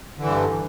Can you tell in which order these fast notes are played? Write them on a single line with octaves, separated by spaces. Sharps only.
D3 E3 G2